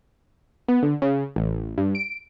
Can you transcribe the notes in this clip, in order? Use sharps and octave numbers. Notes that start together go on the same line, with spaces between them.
B3
D3
C#3
A1
G2
D7